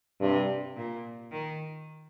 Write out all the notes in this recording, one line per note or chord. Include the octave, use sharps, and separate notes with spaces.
G2 C3
A#2
D#3